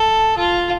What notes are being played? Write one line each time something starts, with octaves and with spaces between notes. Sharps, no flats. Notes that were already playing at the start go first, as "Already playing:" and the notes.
Already playing: A4
F4